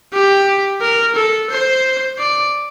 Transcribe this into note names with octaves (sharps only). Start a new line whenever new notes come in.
G4
A#4
A4
C5
D5